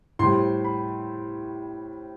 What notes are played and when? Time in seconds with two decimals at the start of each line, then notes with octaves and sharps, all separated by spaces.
0.19 A2 G3 C4 C6
0.65 B5